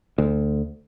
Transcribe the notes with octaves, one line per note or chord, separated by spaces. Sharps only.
D2